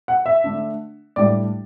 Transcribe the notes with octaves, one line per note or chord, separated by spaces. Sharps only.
F#5
E5
D3 A3 D4
A2 G3 D4 D5